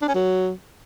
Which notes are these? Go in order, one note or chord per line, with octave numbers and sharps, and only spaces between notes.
D4
C#4
F#3